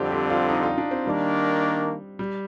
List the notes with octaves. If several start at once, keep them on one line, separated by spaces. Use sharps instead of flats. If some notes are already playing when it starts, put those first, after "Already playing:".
Already playing: F2 D3 G3 C4 G4
G4
F4
D#4
F4
D4
C4
D#3 G3 A#3 D4
G3